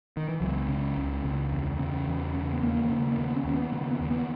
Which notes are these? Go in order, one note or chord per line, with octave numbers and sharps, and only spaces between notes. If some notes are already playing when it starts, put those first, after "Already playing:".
D#3
E3
C#2 F#3
C#3
C#2
C#2
E2
C#3
E2
C#3
B3
D#2 A#3
C#3
A#3
D#2 B3
C#4
D#2
B3
C#3 B3
B3
D#2
B3